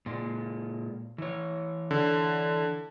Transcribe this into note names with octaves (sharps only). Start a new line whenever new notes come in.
A#2 G#3
E3 C#5
D3